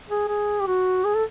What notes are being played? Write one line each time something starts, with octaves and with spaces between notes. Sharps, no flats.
G#4
G#4
G4
F#4
G#4
A4